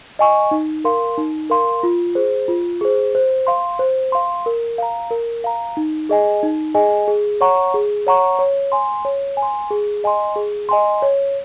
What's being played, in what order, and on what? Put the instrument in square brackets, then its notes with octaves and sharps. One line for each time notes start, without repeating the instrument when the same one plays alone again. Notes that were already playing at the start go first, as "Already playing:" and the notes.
[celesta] D#5 G#5 C#6
D#4
A#4 F5 C6
D#4
A#4 F5 C6
F4
G#4 C5
F4
G#4 C5
C5
F5 C6
C5
F5 C6
A#4
F5 A#5
A#4
F5 A#5
D#4
G#4 D#5 G#5
D#4
G#4 D#5 G#5
G#4
C#5 F#5 A#5 C#6
G#4
C#5 F#5 A#5 C#6
C#5
G#5 C6
C#5
G#5
C6
G#4
D#5 G#5 C6
G#4
D#5 G#5 C6
C#5